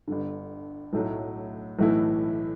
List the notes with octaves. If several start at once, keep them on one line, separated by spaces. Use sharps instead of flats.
G1 G2 D3
B1 A2 F#3 A3
B1 A2 E3 A3 E4